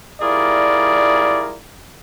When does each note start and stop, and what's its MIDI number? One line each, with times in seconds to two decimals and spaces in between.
0.21 1.56 55
0.21 1.56 64
0.21 1.56 65
0.21 1.56 68
0.21 1.56 70
0.21 1.56 74